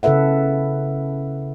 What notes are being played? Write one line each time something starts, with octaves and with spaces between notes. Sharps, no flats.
C#3 E4 A4 B4 E5 F#5